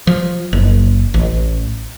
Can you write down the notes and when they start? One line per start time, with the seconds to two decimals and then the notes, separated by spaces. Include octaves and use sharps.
0.07 F3
0.53 F#1
1.14 A1